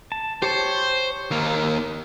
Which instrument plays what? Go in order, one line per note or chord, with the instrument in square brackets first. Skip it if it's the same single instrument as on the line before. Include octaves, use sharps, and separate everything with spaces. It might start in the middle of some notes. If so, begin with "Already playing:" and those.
[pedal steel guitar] A5
[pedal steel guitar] G4 C#5 A5 [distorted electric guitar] C5
[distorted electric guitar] D#2 A#3